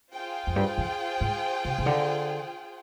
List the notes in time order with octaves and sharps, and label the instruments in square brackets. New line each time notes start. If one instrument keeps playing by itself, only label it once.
[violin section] F4 G#4 C5 G5
[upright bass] F2
G2
F2
G#2
C3
C3
D3